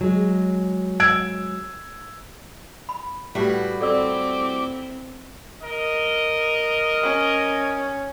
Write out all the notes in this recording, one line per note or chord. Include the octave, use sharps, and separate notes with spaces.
F#3 G#3
E6 G#6 D7
B5
A2 G3 F#4 B4
C4 E4 A4 D5 D6 E6
A#4 D#5
C#4